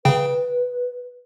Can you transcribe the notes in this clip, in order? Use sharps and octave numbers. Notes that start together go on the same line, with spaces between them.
C#3 B4 G5